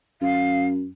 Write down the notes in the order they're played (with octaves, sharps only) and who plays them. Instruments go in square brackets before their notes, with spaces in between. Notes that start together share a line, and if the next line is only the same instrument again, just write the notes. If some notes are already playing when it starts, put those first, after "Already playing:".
[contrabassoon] F#2 [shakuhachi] F5